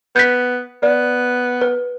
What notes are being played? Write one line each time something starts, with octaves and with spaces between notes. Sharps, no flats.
B3 G6 B6
B3 D5
B4